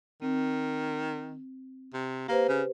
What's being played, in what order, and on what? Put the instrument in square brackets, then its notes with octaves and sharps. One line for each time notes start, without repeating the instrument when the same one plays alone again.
[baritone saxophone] D#3 [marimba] C4
[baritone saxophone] C3
[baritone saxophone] A#3 [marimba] G4 B4 C5
[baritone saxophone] C#3